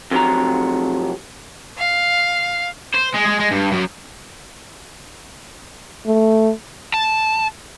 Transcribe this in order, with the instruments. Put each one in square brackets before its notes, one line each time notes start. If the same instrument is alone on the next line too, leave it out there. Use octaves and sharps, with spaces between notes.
[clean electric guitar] F2 C3 F#3 A#5
[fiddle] F5
[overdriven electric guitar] C5
G#3
G#3
G#3
G2
F#2
[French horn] A3
[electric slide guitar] A5